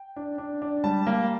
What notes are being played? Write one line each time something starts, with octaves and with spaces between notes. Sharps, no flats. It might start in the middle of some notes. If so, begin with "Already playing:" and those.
Already playing: G5
D4
D4
D4
G3 A5
A#3